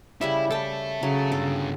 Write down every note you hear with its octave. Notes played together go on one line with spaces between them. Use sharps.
C#3 G3 E4 E5
A4 E5 G5 A5
C#3 F#3
G2 D3 A4